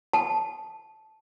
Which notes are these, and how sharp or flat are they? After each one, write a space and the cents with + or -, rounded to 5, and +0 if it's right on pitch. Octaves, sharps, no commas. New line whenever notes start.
A5 -10